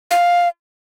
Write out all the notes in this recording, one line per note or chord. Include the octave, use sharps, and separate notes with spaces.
F5